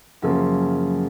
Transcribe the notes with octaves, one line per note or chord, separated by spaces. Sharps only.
F#2 C#3 F3 F#3 A#3